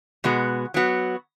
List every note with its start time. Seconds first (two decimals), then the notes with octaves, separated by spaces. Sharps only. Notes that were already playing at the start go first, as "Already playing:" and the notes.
0.24 B2 G#3 B3 F#4
0.74 F#3 B3 F#4